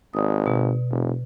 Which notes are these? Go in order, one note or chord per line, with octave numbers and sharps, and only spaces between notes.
G#1 D5 D#6
B2
F1